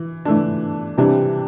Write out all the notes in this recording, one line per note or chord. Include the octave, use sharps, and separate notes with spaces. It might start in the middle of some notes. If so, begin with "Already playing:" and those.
Already playing: E3
E3 A3 D4
C3 E3 G3 D4